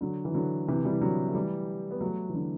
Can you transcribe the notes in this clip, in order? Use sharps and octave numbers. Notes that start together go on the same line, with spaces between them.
D3 F#3
E3
D3 F#3
C3 E3
E3 G3
D3 F#3
A3
E3 G3
B3
F#3 A3
E3
D3 F#3